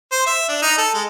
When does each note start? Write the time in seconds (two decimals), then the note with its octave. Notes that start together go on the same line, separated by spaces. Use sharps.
0.12 C5
0.27 E5
0.49 D4
0.62 D#4
0.78 A4
0.94 G#3